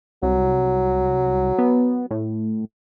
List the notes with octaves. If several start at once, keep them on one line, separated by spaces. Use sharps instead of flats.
C2 F#3
B3
A2